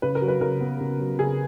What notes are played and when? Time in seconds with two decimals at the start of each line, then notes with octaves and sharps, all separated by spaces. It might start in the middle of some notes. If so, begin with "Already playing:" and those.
0.02 C#3 B4
0.15 A#4
0.22 F#3
0.28 B4
0.41 C#3 A#4
0.61 B3
0.80 C#3
1.00 F#3
1.19 C#3 G#4